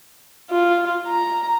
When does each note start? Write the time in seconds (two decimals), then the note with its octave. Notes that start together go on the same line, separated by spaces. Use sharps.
0.52 F4
1.08 A#5